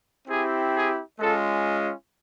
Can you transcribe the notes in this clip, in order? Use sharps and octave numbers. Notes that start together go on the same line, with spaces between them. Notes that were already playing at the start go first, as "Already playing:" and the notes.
C4 E4 G4 G#4
G#4
G#3 C#4 F4 A4